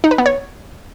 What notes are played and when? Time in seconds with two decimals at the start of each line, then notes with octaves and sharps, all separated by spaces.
0.04 D#4
0.11 B4
0.18 B3
0.26 C#5